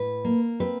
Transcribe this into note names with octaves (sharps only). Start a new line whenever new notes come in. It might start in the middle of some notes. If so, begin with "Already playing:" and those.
Already playing: A2 B4
A#3
C4 B4